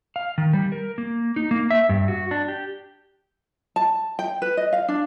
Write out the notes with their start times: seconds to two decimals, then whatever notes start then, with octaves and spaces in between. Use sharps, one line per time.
0.16 F5
0.38 D#3
0.53 G3
0.72 A#4
0.98 A#3
1.36 D#4
1.51 A#3
1.71 E5
1.89 G2
2.08 F#4
2.31 D4
2.48 G4
3.76 A5
4.19 G5
4.42 B4
4.57 D#5
4.73 F5
4.88 D4